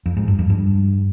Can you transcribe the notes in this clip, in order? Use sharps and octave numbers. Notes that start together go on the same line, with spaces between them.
F2
G#2
G2
F2
G2